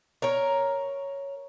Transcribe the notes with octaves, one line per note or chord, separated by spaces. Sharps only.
A#4 C#5